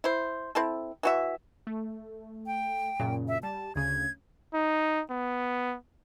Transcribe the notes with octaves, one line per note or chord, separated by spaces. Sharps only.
E4 C5
C4 E4 A4
E3 F#4 E5
A3
G5
F#2 A#2 C#3
E5
G3 A5
D2 C#3 G#6
D#4
B3